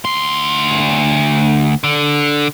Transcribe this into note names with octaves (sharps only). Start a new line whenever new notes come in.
D2 C6
D3